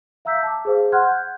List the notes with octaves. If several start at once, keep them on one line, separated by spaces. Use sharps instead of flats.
E5 F5 A#5 E6 G6 B6
A5 D6
G#4 C5 F5
F#5 C6 F6 F#6 G#6
G6